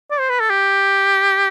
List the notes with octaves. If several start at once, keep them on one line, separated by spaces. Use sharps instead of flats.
D5
C5
B4
A4
G4